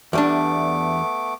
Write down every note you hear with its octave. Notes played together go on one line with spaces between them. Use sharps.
E2 G3 A3 B3 D4 D6